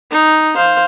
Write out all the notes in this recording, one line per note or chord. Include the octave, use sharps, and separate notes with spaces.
D#4
C5 F5